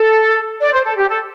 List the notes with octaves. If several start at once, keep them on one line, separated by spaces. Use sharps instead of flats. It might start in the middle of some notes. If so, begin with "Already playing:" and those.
Already playing: A4
D5
C5
A4
G4
A4